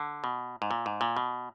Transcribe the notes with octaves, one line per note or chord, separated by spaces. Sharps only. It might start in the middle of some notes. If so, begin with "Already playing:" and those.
Already playing: D3
B2
G#2
A#2
G#2
A#2
B2